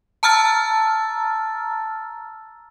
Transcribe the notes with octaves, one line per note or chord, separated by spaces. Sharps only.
A5 A#5 E6 F6 A6